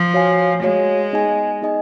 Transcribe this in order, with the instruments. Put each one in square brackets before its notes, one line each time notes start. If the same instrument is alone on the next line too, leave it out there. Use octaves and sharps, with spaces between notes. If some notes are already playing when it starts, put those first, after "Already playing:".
Already playing: [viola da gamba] F3
[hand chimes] F#4 C#5 F5 G#5
[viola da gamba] G#3 [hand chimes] F#4 C#5 F5 G#5
[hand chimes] B3 D#4 G#4 D#5 G#5
B3 D#4 G#4 D#5 G#5